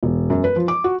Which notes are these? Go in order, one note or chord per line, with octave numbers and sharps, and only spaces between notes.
E1
F#2
B4
F3
D6
F#4